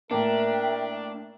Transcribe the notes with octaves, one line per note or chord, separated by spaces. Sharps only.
A2 A#3 D4 A#4 E5 G5